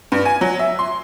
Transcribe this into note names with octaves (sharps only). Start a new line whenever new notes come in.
G2
G#5
F#3
E5
C6